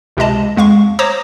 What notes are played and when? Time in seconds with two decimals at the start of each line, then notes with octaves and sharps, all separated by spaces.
0.17 C#2 C3 G#3 D#5 A5
0.56 F2 G#3 F5 C#6
0.99 C5 C#5 A#5 D6 D#6 A#6